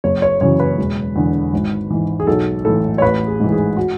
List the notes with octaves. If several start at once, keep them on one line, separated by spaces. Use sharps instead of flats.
F#1 C#5
C#5
F#2 C#3 E3 C#5
B4
E1
E2 D3
G#1
G#2 E3
G#4
B1 A4
A2 E3 A4
C#5
A1 B4
G#4
G#2 E3
G#4
F#4